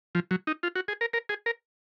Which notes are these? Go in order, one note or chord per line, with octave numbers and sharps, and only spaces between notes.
F3
F#3
D#4
F4
F#4
G#4
A#4
A#4
G#4
A#4